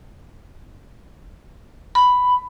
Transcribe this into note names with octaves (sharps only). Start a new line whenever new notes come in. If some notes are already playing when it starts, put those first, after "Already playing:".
B5